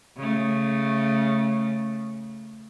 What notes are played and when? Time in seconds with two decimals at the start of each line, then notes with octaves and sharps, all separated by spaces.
0.17 C#3 A3